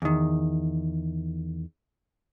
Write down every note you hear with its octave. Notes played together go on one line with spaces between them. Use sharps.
E2 D#3